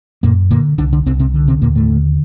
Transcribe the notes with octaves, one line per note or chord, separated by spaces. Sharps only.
F#2 A#2 A#3
A#2 D3 A#3
C2 D3 D4
D3 D4
C2 C3 C4
C3 C4
D3
C3 C4
D#2 A#2 A#3
A2 A3
D3